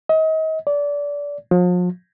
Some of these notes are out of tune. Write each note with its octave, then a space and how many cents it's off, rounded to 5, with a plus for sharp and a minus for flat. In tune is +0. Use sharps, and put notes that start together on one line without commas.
D#5 +35
D5 -25
F3 +40